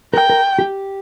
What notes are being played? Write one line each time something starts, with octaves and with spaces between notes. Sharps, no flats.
A#4 G5
A#4
G4